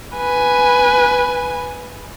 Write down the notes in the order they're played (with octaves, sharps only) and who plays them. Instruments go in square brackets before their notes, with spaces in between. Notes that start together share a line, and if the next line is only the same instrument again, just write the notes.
[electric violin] B4 G#5